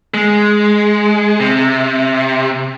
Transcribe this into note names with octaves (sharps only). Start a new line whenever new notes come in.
G#3
C3